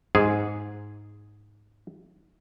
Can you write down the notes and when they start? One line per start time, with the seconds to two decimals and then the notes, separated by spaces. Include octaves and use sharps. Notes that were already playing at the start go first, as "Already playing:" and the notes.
0.15 G#2 G#4